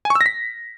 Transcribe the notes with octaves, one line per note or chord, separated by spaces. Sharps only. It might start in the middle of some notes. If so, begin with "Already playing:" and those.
G#5
C#6
E6
A#6
B6